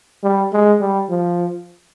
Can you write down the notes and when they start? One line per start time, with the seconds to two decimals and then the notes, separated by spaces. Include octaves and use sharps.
0.24 G3
0.53 G#3
0.81 G3
1.09 F3